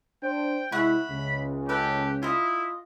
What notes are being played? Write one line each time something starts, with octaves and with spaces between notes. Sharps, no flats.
D4 C5 G5
C3 G#3 E4 E5 F#5 B5 C#6
C#2 C#3
G4 A4 B4
E4 F4 D#5